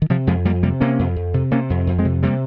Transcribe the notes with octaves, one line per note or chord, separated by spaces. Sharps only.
D#3
C3 F3
F2 F3 G#3
F2 G3 A#3
C3 G3 A#3
C3 A#3 C#4
F2
F2
C3
C3 A#3 C#4
F2
F2
G#3 C4
C3
C3 G3 A#3